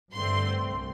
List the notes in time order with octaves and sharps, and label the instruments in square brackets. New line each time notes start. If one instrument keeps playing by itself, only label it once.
[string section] G2 D3 A3 C4 C6
C2